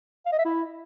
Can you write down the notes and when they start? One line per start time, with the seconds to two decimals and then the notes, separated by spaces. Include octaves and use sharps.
0.26 F5
0.32 D#5
0.39 E5
0.45 E4